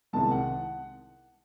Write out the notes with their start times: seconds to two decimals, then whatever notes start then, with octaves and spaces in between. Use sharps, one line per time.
0.13 C2 C3 D#3 G#3 A5
0.31 F#5